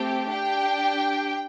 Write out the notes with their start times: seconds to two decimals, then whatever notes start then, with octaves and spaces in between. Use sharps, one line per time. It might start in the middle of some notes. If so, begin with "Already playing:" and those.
Already playing: A3 C4 G4 G5
0.29 D4 G4 G5